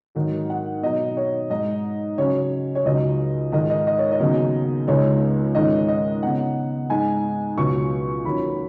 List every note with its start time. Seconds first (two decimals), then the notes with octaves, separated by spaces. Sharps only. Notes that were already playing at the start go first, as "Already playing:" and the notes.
0.15 G#2 D#3 F#3 D#4
0.50 F#5
0.82 B2 F#3 D#4 D#5
1.17 C#5
1.50 G#2 G#3 D#4 D#5
2.18 C#3 F#3 C#4 C#5
2.75 C#5
2.85 C#2 C#3 F#3 D#4 D#5
3.52 G#2 D#3 G#3 D#5
3.70 D#5
3.87 D#5
3.98 C#5
4.12 D#5
4.20 D#2 C#3 F#3 B3 D#4
4.87 C#2 C#3 G#3 D#4 C#5
5.55 G#2 D#3 G#3 C#4 D#5
5.88 D#5
6.23 C#3 B3 D#4 F#5
6.90 G#2 G#3 D#4 G#5
7.57 C#2 B2 F#3 C#6
8.25 D#2 D#3 F#3 C#4 B5